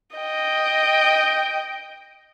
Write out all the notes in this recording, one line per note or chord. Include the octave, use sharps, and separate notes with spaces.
D#5 G5